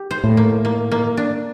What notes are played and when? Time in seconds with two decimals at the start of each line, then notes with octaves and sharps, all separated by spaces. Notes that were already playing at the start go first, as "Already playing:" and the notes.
Already playing: G4
0.11 C5
0.24 A2
0.37 A#3
0.65 A#3
0.92 A#3
1.17 D4